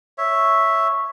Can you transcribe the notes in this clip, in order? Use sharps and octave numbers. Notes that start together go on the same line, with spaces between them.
C#5 E5